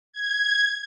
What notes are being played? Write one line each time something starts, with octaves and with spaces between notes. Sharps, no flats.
G#6